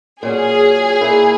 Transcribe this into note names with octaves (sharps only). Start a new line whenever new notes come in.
A#2 F#3 C#4 G#4
A#2 A#3 E4